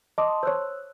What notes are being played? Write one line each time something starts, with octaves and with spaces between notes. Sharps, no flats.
D#5 A5 C6 D6 D#6
C5 C#5 E6 F#6